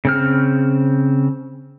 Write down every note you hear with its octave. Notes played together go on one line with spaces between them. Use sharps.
C#3 C4 F6